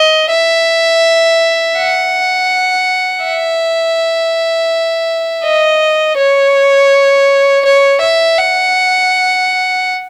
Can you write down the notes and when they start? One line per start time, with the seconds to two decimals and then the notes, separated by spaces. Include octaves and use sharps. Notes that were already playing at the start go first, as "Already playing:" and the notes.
Already playing: D#5
0.30 E5
1.77 F#5
3.24 E5
5.44 D#5
6.17 C#5
7.65 C#5
8.01 E5
8.38 F#5